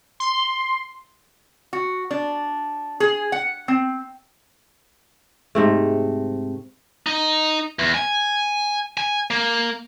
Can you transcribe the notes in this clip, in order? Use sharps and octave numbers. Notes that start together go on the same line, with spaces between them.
C6
F#4
D4
G#4
F#5
C4
G#2 C3 A3
D#4
E2
G#5
G#5
A#3